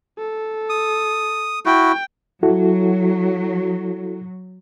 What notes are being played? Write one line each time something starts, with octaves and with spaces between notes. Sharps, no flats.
A4
D#6
E4 F#4 G5
F#3 E4 F#4 A4